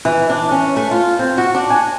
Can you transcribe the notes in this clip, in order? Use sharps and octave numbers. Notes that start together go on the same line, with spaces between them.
E3
D4
C#4
A3
F4
C4
F#4
D4
G#5